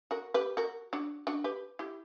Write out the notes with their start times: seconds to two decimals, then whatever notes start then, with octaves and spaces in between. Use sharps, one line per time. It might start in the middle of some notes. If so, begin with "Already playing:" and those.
0.11 F#4 A#4
0.34 G4 B4
0.57 F#4 A#4
0.93 D4 F#4
1.27 D4 F#4
1.44 G4 B4
1.79 E4 G4